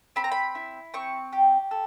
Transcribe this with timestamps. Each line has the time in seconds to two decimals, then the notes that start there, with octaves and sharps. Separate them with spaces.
0.16 C4 B5
0.24 A#5
0.32 B5
0.55 E4
0.94 C4 C#6
1.33 G4
1.71 A4